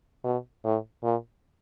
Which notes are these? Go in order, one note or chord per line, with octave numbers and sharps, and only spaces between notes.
B2
A2
A#2